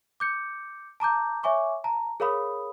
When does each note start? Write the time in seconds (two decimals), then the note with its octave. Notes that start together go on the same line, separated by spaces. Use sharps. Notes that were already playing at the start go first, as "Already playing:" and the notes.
0.20 D6 G6 C#7
1.00 A5 A#5 D6 G6
1.43 C#5 E5 G#5 C#6 D6
1.84 A5 A#5
2.20 G#4 A#4 C#5 F5 B5 D#6